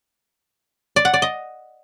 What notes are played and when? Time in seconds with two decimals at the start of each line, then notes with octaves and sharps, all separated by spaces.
0.96 D5
1.05 F#5
1.14 D5
1.22 D#5